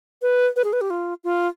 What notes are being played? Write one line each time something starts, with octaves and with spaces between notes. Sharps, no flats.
B4
B4
G#4
B4
G4
F4
F4